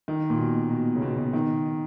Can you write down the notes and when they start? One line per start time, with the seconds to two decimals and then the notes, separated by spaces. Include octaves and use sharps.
0.08 D#3
0.30 A#2
0.39 B2
0.70 B2
0.96 C#3
1.02 B2
1.17 B2
1.33 D#3